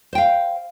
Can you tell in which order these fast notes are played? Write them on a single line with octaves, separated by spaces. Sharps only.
C5 G5 F5